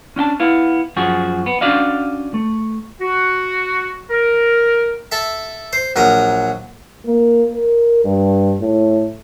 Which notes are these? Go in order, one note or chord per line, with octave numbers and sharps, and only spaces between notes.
C#4 D4 G5 A5
B3 E4 F5
F#2 F3 F#4 G#4
B3
C#4 D4 F#4 D5 D#5 F5
A3
F#4
A#4
A4 E5
C5
A#1 F#3 A#4 D#6
A#3
A#4
G2
A2